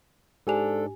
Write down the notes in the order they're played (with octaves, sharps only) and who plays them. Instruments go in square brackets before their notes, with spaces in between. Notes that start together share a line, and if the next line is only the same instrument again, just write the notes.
[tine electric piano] G#2 D4 [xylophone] G4 G#5 F7 [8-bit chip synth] A4